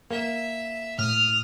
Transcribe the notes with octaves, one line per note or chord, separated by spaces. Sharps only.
A#3 E5
A2 D#6 F6